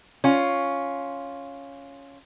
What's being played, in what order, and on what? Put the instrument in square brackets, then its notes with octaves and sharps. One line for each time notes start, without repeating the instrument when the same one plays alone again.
[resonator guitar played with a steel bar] C#4 F4